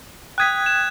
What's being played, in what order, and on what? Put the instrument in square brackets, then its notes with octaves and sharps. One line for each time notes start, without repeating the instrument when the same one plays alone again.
[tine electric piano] G5 D#6 B6 [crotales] F#6 G#6
[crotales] E7